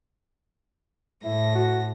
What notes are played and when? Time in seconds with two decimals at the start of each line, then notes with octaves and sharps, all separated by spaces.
1.24 A2 E4 A#6
1.55 F#4